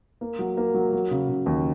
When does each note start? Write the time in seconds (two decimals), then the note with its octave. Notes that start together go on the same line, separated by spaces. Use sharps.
0.21 A#3
0.39 F#3
0.57 A#3
0.74 F#3
0.93 F#3
1.11 C#3
1.29 C#3
1.46 D#2